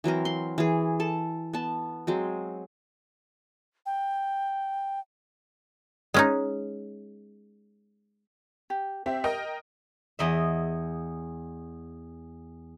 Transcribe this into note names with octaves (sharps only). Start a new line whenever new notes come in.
E3 F#3 C4 A#4
C6
E3 G#4
A4 A5
B3 A5
F#3 G#3 C4
G5
G#3 C#4 D#4
G4
C4 G4 E5
A#4 D#5 G5
E2 D#5 E5